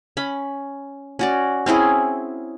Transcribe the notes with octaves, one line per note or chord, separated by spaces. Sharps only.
C#4 B5
C#4 F#4 D5
C4 C#4 E4 G#4